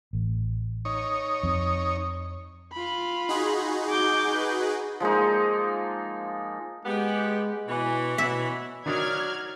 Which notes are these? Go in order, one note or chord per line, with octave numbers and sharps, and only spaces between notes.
A1
D#4 C#5
F2
F4 B5
D#4 F#4 G#4
D6 G6
B4
F3 G#3 A#3 D#4
G#3 B3 G4
B2 E3 C#5 B5
B2 E5
D#3 F#3 D4 D#4 D5 F6 G#6